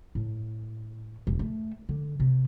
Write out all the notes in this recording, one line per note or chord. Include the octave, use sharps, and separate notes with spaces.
A2
E1
A3
D3
C3